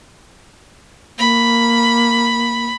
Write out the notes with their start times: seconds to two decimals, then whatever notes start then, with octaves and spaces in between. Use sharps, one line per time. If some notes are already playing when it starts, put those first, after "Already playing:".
1.19 A#3 B5